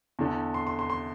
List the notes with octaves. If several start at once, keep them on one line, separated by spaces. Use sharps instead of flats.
E2 D3
C6
C6
C6
C6